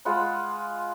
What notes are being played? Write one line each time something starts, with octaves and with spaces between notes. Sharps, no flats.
G#3 F4 F#5 B5